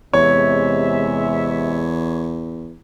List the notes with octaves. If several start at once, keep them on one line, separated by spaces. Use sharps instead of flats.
E2 C3 G#3 C#5 E5